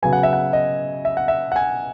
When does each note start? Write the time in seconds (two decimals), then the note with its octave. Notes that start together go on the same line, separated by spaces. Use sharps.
0.02 C#3 F#3 B3 G#5
0.13 F#5
0.23 E5
0.33 F#5
0.53 D#5
1.05 E5
1.17 F#5
1.28 E5
1.52 F#5
1.56 G#5